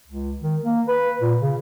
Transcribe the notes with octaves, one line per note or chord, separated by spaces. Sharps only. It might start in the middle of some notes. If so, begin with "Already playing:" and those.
C#2
D#3
A#3
B4
A#2
C#3